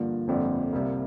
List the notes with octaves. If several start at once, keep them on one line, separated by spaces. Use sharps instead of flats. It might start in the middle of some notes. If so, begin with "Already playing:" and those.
Already playing: G2 D3 F3 A#3
G1 F2 D3 G3 C4
C2 C3 G3 A#3